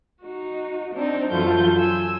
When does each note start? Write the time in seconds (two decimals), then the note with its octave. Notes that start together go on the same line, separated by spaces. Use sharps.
0.22 D#4 F#4
0.93 C4 D4 D#4
1.31 F#2 E3 F#3 F4 A4 G6
1.78 G#5 E6